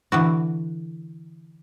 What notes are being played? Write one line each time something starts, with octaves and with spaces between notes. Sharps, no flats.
D3 E3 F#4